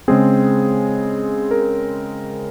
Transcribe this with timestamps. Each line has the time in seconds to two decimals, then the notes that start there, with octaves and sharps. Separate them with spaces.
0.08 C#3 G#3 C4 G#4
1.51 A#4